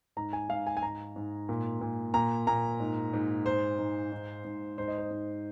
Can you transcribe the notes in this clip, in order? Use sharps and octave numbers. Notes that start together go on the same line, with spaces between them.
G#2 A#5
G#5
G#2 F5
G#5
G#5
G#2 A#5
G#2
A#2
A#2
A#2 A#5
A#2 A#5
G#2
G#2
G#2 C5
G#2
G#2
G#2
G#2 C5
D#5
C5
G#2